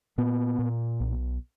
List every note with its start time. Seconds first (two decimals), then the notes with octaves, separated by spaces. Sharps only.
0.18 A#2 B3
0.59 A#2
1.00 B1